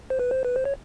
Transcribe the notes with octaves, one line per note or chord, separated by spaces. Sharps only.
C5
B4
C5
B4
C5
C#5